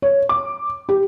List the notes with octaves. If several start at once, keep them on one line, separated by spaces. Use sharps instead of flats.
C#5
D6
G4